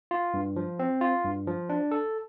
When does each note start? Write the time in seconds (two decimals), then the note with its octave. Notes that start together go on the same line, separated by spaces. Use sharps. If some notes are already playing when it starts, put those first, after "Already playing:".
0.11 F4
0.34 G2
0.56 F3
0.79 C4
1.01 F4
1.24 G2
1.47 F3
1.69 D4
1.91 A4